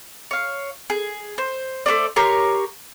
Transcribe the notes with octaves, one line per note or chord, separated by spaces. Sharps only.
C#5 F5
G#4
C5
A3 A#3 C5 D5
G4 A#4 C#5 C6